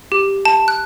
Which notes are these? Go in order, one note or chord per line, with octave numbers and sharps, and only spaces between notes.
G4
A5
F#6